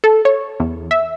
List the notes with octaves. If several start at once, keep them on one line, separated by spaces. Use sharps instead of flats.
A4
C#5
E2
E5